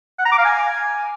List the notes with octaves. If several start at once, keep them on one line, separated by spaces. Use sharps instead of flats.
F#5
A#5
D6
F5
G#5